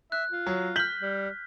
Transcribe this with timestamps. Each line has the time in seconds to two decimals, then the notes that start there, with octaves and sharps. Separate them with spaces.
0.12 E5 F#6
0.31 F4
0.46 F#3
0.76 F6 G6 B6 F#7
1.02 G3